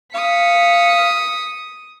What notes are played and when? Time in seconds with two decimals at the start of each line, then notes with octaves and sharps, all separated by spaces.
0.14 F5 D#6 B6 C#7